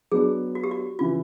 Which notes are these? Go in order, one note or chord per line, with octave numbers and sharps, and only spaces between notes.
F#3 B3 D4 G#4
F#4
G4
F#4
C#3 E3 F4